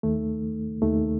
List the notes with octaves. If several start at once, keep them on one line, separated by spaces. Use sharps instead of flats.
D#2 D#3 A3
D#2 D#3 A3